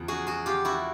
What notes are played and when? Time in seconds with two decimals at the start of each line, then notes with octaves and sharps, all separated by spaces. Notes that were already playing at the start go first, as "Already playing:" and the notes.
Already playing: E2 C#3 F3
0.08 F#4 G#4
0.27 F#4 G#4
0.46 F4 G4
0.65 E4 F#4